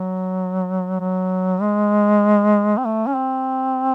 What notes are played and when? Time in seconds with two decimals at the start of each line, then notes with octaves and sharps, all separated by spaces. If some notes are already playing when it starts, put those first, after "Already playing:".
Already playing: F#3
1.00 F#3
1.62 G#3
2.78 C4
2.85 A3
3.07 C#4
3.16 C4